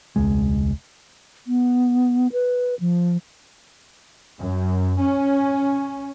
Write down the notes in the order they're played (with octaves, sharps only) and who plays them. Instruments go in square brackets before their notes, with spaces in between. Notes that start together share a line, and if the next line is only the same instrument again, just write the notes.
[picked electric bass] E1 C#2 G#3
[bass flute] B3
B4
F3
[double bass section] F#2
C#4